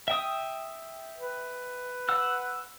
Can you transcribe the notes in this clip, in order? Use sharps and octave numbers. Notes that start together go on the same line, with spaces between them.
E5 G5 D#6
B4
F#5 E6 F#6